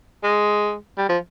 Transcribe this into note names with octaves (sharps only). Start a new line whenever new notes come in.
G#3
G3
F3